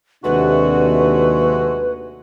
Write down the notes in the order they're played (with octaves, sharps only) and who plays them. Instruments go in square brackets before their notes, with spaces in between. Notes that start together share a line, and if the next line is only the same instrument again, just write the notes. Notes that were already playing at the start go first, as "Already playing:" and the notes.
[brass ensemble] D#2 C3 [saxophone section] G#3 A3 F#4 [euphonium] D4 [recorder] B4